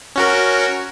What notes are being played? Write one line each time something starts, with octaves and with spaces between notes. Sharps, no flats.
C#4 F#4 A#4